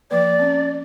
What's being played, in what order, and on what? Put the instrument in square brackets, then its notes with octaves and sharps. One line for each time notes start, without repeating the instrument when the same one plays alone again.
[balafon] F3 A#3 B4 [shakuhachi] D5
[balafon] C4 C#4